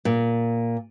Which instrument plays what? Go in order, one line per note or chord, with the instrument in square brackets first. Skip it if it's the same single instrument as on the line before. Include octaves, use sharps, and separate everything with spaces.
[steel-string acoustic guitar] A#2